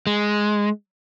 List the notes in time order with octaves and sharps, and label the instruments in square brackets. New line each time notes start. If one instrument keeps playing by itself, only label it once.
[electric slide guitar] G#3